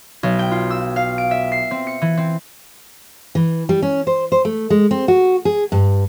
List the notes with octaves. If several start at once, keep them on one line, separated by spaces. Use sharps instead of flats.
B1
G5
F4
E6
F5
D7
E5
C7
C4
C#7
E3
C4
E3
G3
C#4
C5
C5
A3
G#3
C4
F#4
G#4
G2